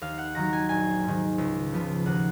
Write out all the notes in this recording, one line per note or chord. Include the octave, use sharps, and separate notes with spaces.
D#2 F5
F#5
D#3 F#3 A#5
G#5
A#1 G#5
G#2 D#3
C#2
C#3 F3 B3
D#2 F#5